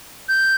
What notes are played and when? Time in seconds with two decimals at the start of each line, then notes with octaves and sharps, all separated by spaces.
0.29 G6